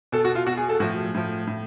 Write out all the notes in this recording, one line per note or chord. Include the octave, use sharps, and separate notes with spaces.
B2 A4
F#4
F4
B2 F#4
G#4
A4
A2 F3 F#4
A2 F3
A2